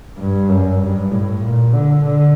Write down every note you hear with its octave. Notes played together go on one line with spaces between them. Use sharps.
G2
F#2
G2
A2
A#2
D3
D3